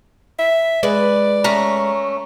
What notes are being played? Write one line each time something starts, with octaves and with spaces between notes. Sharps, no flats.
E5
G#3 B4 D5
A3 C#4 A#5